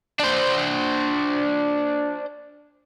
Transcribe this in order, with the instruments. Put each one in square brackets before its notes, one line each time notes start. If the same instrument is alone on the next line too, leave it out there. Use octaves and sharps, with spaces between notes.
[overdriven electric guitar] D4 C5